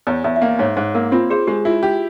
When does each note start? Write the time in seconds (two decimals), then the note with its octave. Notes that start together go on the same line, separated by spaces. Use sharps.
0.07 E2 C#5
0.24 E2 E5
0.36 E5
0.42 A#3 F5
0.59 G#2 C#5
0.77 G#2 C5
0.94 A#3 A#4
1.12 C4 F4
1.30 G#4 C5
1.47 G#3 G4
1.65 E4 F4
1.83 G4